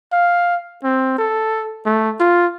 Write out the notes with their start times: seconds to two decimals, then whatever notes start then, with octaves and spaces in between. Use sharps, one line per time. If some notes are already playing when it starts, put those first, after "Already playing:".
0.13 F5
0.84 C4
1.18 A4
1.86 A3
2.20 F4